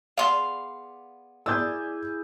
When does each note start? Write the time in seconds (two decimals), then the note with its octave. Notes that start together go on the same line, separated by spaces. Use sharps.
0.17 B3 G#4 D5 F5 C6
1.46 E4 G#4 D5 G#5 E6 G6